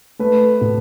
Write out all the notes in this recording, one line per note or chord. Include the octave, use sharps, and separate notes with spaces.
A3 B4
A2